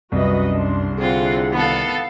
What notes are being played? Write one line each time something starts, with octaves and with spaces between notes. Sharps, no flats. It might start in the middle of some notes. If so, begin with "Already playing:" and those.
C2 F#2 F#4 B4 D#5
D4 C6
D3 C4 E4 F4 G#4 F#5
D#3 B3 A4 F5